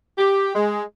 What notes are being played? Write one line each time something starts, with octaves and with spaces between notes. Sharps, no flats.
G4
G#3